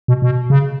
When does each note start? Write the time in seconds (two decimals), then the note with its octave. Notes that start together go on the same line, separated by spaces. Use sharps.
0.08 B2
0.22 B2
0.50 C#3